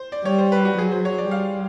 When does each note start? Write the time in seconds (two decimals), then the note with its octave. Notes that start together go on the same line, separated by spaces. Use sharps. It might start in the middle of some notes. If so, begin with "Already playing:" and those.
Already playing: C5
0.12 D5
0.25 G3 C#5
0.38 C5
0.52 B4
0.65 F#4
0.78 F#3 G#4
0.92 C5
1.05 C#5
1.18 D5
1.31 G3 F5